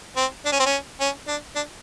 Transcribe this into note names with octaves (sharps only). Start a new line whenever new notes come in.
C4
D4
C#4
C4
C#4
C#4
D4
D4